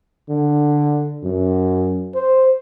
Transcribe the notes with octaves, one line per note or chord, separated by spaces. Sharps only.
D3
F#2
C5